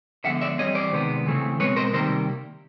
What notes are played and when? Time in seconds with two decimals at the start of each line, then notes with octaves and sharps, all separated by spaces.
0.24 D3 F3 G#3 B3 E5 F#5
0.41 D5 E5
0.58 E3 G3 C4 C#5 D#5
0.75 C5 D5
0.92 C3 D#3 G#3 B3
1.26 C#3 E3 A3 C4
1.60 B2 G#3 C4 B4 C#5
1.76 A#4 C5
1.93 C3 D#3 G3 A#3 A#4 C5